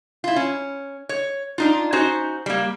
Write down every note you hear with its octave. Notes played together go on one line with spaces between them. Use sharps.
E4 F4
C#4
C#5
D4 D#4 F4
C#4 D#4 F#4 C5
G3 A#3